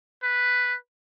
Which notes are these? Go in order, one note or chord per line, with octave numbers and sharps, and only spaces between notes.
B4